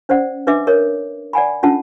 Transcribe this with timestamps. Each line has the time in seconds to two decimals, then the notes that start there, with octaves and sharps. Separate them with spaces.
0.09 C#4 C5 D5 F#5
0.47 D4 B4 D#5 E5 D6
0.67 A#4 C#5 D#5
1.33 D5 F#5 G#5 B5
1.63 C#4 D4 F4 A4 F#5 A5